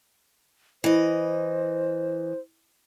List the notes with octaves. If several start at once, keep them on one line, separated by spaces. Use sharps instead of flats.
E3 C5 D#5